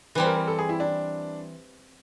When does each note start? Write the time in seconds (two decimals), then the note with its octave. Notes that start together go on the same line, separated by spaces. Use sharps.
0.15 E3 G3 C4 B4
0.26 A#4
0.37 A#4
0.48 A4
0.59 G#4
0.69 E4
0.80 D4